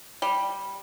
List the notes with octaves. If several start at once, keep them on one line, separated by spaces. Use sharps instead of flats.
G3